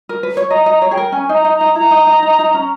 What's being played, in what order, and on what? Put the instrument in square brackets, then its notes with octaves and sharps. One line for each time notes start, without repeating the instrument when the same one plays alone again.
[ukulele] A#4
B4
C#5
[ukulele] D#5 [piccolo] A#5
[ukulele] D#5 [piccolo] A#5
[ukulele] C#5
[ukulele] G#4 [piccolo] G5
[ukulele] A#4
[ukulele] C#4 [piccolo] G#5
[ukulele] D#4 [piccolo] A#5
[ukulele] D#4
[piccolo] A#5
[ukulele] D#4
[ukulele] E4 [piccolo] A#5
[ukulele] D#4
D#4
D#4
D#4
C#4